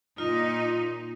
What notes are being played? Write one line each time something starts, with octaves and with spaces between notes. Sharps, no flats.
A#2 D#4 F4